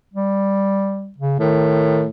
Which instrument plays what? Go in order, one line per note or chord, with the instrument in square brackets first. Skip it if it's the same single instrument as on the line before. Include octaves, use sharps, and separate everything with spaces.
[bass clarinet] G3
C#3
[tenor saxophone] A2 [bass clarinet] D#3